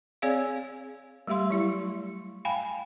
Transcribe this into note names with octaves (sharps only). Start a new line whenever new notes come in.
C4 G#4 C#5 D5 F5
G3 A3 G4 F5 C6
F#3 E4 G4
F5 G5 G#5 B5